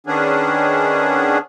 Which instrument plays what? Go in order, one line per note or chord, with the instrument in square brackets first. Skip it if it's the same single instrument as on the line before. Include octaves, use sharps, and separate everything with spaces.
[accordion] D#3 B3 C#4 D4 G#4